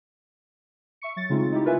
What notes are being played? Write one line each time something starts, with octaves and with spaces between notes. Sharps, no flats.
E5 C#6 C#7
F#3 A6
C#3 G#3 A3 C4 D#4 F4
D#4 E4 G4
E4 F4 A#4 B4 E5 G#5